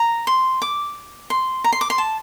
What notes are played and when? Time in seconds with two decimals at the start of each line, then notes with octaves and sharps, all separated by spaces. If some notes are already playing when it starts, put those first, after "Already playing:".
Already playing: A#5
0.27 C6
0.62 D6
1.30 C6
1.64 A#5
1.72 C6
1.81 D6
1.90 C6
1.98 A5